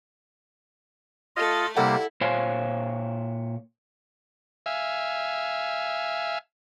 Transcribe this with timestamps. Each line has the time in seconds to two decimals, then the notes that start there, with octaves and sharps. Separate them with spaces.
1.36 A3 F4 A4 D#5
1.76 C3 G3 A#3 E4 A4 F#5
2.21 A#2 C5 C#5 F5 G#5
4.66 E5 F5 G#5